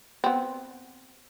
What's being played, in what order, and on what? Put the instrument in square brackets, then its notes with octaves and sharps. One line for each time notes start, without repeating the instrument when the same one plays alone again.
[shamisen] B3 C4